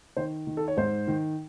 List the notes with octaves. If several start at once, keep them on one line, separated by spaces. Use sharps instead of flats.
D#3 C5
D#3
A4
C#5
G#2 C5
D#3